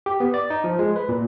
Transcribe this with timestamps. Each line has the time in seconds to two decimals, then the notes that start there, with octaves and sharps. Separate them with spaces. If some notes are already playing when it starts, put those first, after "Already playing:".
0.06 G4
0.20 B3
0.34 D5
0.50 D#4
0.64 F3
0.79 G#3
0.96 B4
1.09 A#2